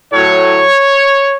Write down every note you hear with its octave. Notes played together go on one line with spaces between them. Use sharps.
A2 F#3 C#5